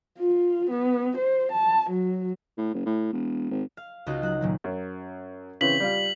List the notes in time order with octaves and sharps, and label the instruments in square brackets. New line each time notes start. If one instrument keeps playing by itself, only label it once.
[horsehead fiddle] F4
B3
C5
A5
F#3
[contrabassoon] A2
F#1
A2
E1
G#1
[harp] F5
C#2 C#3 D#4 F4 F#4 D#5
F#3 F#4 F#5
A#2 D#3 F#3
[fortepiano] F#2
[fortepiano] C#3 E3 C4 [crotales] B6 F#7
[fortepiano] G3 F4